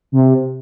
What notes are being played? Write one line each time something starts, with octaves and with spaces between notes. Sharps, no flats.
C3